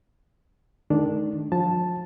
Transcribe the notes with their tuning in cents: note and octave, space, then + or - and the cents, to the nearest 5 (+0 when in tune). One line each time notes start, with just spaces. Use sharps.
D#3 +0 A3 -45 D4 -5
F3 +35 A5 +0